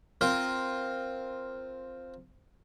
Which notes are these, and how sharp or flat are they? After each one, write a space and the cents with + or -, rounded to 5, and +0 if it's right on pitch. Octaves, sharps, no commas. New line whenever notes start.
C4 +0 F4 +0 A#4 +0